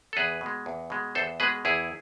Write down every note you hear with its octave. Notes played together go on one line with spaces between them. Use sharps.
A4
E2 G#4 B4
B2 G#3
E2
B2 G#3
E2 A4 C5
B2 G#3 G#4 B4
E2 E4 G#4